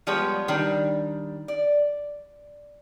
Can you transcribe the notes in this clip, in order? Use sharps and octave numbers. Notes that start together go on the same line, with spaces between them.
F3 G3 G#3 B3 C#5
D#3 G3 D4
D5